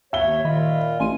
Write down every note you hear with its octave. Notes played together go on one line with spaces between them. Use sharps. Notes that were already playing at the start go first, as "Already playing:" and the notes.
D#2 C#5 E5 G7
A#2 D#3 F4 D#5 B5
A1 G#5 C6 D#7